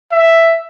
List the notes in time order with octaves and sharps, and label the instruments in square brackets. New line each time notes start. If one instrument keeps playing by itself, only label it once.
[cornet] E5